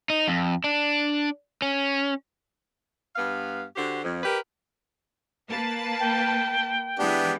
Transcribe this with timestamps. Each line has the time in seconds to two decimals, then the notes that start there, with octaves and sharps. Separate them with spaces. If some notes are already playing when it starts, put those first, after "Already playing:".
0.10 D#4
0.28 F2
0.64 D4
1.62 C#4
3.15 G2 B3 F5
3.75 D3 F#4 G4 C5
4.03 F2
4.23 G4 A#4 B4 D5
5.48 A#3 B4 A5
6.00 G5
6.99 E3 G#3 B3 D4 G4